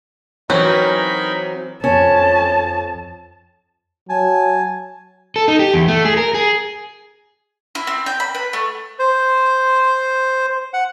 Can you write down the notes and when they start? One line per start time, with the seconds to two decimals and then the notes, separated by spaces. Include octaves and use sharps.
0.50 E3 F#3 C4 C#4 D#4 A#4 B4 B5
1.84 F2 C#4 A5
4.09 F#3 G#5 A5
5.36 A4
5.48 D#4
5.59 G4
5.74 E2
5.88 A3
6.05 G#4
6.17 A#4
6.34 G#4
7.75 E4
7.87 C4
8.06 G5
8.20 B5
8.35 B4
8.53 A3
8.99 C5
10.73 F#5